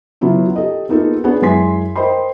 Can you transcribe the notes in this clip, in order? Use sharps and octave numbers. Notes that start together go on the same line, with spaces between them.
C#3 F#3 B3 E4 F4
G4 A4 D#5
A#3 B3 D#4 F4 G#4 A4
B3 C#4 D4 F#4 G#4 F#5
F#2 G#3 E4 G#5 C6 B6
A#4 C5 D#5 G5 B5 C6